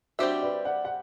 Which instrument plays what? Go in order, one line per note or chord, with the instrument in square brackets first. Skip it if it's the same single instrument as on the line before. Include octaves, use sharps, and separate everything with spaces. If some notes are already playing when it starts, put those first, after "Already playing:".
[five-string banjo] G3 C4 G4 C5 E5 [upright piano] D4 F#4
[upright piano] B4 D5
D5 F#5
F#5